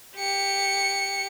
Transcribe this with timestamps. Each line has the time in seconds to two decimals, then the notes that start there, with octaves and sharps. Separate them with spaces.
0.17 G4 C#7